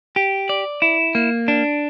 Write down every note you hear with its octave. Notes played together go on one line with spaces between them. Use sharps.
G4
D5
E4
A#3
D4